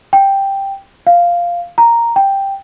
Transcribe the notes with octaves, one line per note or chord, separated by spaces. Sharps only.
G5
F5
A#5
G5